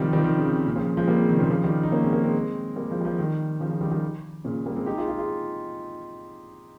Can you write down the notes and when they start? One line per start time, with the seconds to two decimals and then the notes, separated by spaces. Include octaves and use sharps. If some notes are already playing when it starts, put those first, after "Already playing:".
Already playing: C3 D#3 F3 G3
0.13 D#3 G3
0.19 F3
0.24 C3 D#3
0.38 C#3
0.45 C3
0.56 C3
0.66 A#2
0.76 C#3 F3
0.97 F3 G#3
1.08 G3 A#3
1.18 G#3 C4
1.29 C3 D#3
1.39 A#2 C#3
1.50 C#3 F3
1.64 D#3 G3
1.83 D#4
1.92 A#3 C#4
2.03 G#3 C4
2.13 G3 A#3
2.24 G#3 C4
2.76 G3 A#3
2.90 F3 G#3
3.01 G3
3.04 F3 G#3
3.18 D#3 G3
3.60 C#3 F3
3.70 C#3 F3
3.81 D#3 G3
3.91 D#3 G3
4.45 A#2 C#3
4.66 G3 A#3
4.75 G#3 C4
4.86 D#4 G4
4.97 F4 G#4
5.08 F4 G#4
5.18 F4 G#4